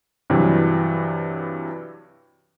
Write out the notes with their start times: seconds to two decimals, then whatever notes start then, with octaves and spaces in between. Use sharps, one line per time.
0.30 G2 C3 E3 F#3